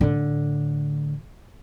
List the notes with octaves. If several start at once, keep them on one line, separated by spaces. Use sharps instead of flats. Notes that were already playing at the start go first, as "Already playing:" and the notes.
A2 D3